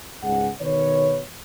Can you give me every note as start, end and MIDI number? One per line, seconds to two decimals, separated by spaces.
0.23 0.49 37
0.23 0.49 44
0.23 0.49 68
0.23 0.49 78
0.61 1.20 47
0.61 1.20 51
0.61 1.20 71
0.61 1.20 73